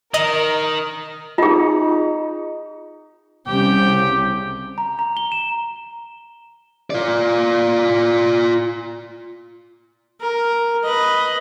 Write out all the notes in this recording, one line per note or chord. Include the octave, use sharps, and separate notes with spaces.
D#3 A#4 D#5
D#4 F4 G#4
C2 C#3 G4 G5
A#5
A#5
G7
E7
F4 D5
A#4
B4 D#5